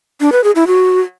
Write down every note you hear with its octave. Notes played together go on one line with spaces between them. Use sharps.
D4
B4
G#4
E4
F#4